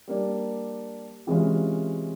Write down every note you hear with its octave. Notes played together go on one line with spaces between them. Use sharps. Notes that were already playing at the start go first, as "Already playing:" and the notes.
G3 A#3 D4
C3 E3 G#3 C#4 F4